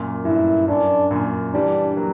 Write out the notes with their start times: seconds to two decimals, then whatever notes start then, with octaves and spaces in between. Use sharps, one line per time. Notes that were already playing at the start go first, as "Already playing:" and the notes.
Already playing: F#2 A#2
0.25 G2 E4
0.68 F#2 D4
1.11 F#2 A#2
1.54 E3 G3 D4
1.97 F#3 A#3